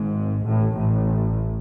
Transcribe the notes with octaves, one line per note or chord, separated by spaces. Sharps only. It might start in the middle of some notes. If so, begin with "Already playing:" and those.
Already playing: G#1 G#2
A1 A2
A1 A2